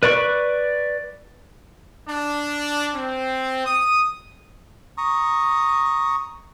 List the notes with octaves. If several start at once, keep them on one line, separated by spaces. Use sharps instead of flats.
B4 D5 B5 C#6
D4
C4
D#6
A#5 C#6 D#6